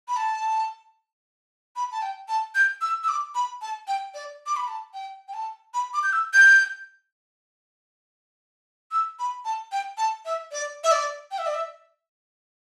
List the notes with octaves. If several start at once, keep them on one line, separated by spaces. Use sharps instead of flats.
B5
A5
B5
A5
G5
A5
G6
E6
E6
D6
B5
A5
G5
D5
D6
B5
A5
G5
G5
A5
B5
D6
G6
E6
G6
E6
B5
A5
G5
A5
E5
D5
E5
D5
G5
E5
D5
E5